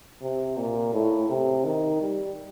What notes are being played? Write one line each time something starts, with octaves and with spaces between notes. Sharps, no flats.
C3
A#2
A2
C3
D#3
G3